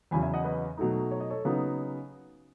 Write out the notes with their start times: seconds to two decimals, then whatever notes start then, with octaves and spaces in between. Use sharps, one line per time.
0.11 E2 C#3 F#3 G#5 B5
0.22 E5 G#5
0.34 D#5 F#5
0.44 B4 D#5
0.77 B2 F#3 A3 D#4
1.11 C#5
1.20 D#5
1.30 A4 C#5
1.45 C#3 F#3 B3 D#4